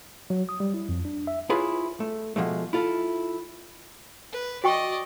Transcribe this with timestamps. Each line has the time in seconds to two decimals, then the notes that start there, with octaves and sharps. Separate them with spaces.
0.30 F#3
0.49 D#6
0.60 G3
0.74 E4
0.89 F2
1.05 D4
1.27 E5
1.50 E4 F4 G#4 B4 C#5
2.00 A3
2.36 B2 F3 G#3 A3
2.73 E4 F4 A4
4.32 B4
4.64 F#4 D5 D#5 G5 C#6